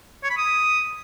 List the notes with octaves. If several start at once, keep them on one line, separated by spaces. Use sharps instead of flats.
C#5
B5
D#6